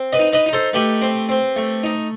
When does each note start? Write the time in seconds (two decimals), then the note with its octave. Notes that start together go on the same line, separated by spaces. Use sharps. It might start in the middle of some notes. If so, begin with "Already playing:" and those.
Already playing: C4
0.13 B4 D#5
0.19 D#4
0.33 B4 D#5
0.46 D#4
0.53 A4 C5
0.73 A3 G4 B4
1.02 C4
1.29 C4
1.56 A3
1.84 D#4